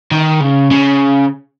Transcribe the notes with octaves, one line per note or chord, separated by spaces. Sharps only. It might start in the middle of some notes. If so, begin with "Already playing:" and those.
D#3
C#3
C#3